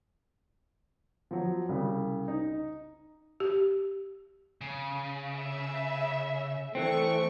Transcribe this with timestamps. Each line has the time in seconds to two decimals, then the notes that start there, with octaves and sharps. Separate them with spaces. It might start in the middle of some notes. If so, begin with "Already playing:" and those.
1.31 F3 F#3
1.69 C2 C#3
2.28 D#4
3.40 G4
4.61 C#3
5.35 E5
6.75 E3 A3 C4 C#6